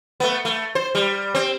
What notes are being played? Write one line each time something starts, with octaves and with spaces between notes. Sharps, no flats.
A3 B3
A3
C5
G3
C4